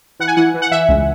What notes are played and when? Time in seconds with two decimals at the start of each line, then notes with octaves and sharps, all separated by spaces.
0.20 E3 F#5
0.28 G#5
0.36 E3 F#5
0.54 E3
0.62 F#5
0.72 E3 E5
0.89 C#2